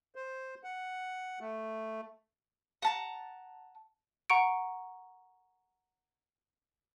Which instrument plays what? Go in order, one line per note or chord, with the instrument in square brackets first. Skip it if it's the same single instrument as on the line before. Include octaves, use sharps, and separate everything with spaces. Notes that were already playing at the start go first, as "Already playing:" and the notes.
[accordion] C5
F#5
A3
[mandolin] F#5 A5 A#5
[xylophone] F#5 A#5 C#6 C#7 D7